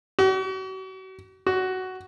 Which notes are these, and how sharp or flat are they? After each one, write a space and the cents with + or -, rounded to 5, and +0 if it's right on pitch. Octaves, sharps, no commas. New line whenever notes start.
F#4 +40
F#4 +10